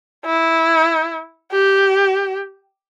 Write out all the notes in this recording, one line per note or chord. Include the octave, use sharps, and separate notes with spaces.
E4
G4